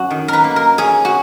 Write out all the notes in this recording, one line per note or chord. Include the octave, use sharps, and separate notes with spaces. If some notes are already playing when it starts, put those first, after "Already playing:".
Already playing: F#2 F#3 F#4
D#3
A#4 B4
A#3
A#4
C#4 G#4
F#4